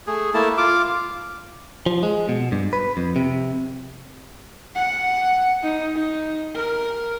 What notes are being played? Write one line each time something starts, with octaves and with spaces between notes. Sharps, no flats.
A3 G#4
A3 A#3 E4 A5
F4 D6
F3
G#3
B2
G2
B4
F2
C3
F#5
D#4
D#4
A#4